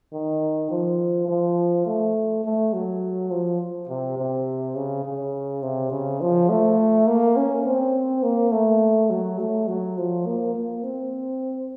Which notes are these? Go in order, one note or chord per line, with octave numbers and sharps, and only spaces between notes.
D#3
F3
F3
A3
A3
F#3
F3
C3
C3
C#3
C#3
C3
C#3
F3
A3
A#3
C#4
C4
A#3
A3
F#3
A3
F#3
F3
A#3
A#3
C4